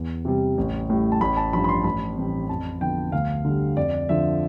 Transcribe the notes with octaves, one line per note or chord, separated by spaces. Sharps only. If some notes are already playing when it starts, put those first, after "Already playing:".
Already playing: E2
C3 G3
A1
A2 G3
A5
A1 B5
A5
G2 F3 B5
B5
C6
A1 B5
A2 E3 G3 C4
F2 A5
D3 F3 B3 G5
D2 F5
D3 G3
F2 D5
D3 F3 E5